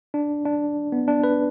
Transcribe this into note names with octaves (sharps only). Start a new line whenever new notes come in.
D4
D4
B3
D4
B4